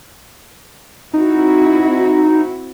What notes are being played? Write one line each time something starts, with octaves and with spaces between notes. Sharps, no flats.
C4 D#4 E4 F#4